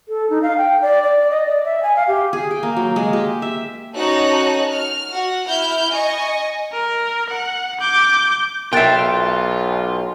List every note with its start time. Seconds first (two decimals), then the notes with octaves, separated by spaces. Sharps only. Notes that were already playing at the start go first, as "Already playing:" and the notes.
0.09 A4
0.30 D#4
0.43 F5
0.57 G5
0.82 D5
1.03 D5
1.30 D#5
1.46 D5
1.65 E5
1.83 G#5
1.96 F5
2.08 G4
2.33 G#4
2.51 G5
2.63 A#3
2.77 F#3
2.96 G#3
3.13 G4
3.42 E5
3.95 C#4 D#4 F#4 A4 C#5 F#6
4.71 F6
5.11 F#4 F#5
5.46 E4 F6 G6
5.91 D#5 G#5 C#6
6.72 A#4
7.30 F#5
7.81 D6 G6
8.73 B1 F4 A#4 E5 G5 F#6 A6